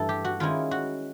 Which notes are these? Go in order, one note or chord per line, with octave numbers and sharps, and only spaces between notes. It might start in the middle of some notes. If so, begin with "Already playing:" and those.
Already playing: G2 E3 A3 A4
G4
F#4
D#3 G#3 C#4 E4 F4
F#4